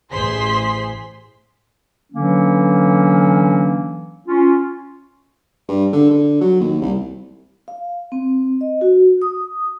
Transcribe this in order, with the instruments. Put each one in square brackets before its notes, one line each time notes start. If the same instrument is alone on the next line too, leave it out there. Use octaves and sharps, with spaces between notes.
[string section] A1 G#4 C5 C6 B6
[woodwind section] D3 E3 F#3 A#3 C#4 D4
C#4 F4
[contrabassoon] G2
D3
D3
F#3
D#2
C2
[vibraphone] F5
C4
D#5
F#4
D#6